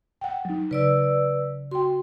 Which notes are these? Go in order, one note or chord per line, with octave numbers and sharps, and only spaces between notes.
F#5 G5
F#3 D#4
C#3 B4 D5 E6
F#4 G5 C6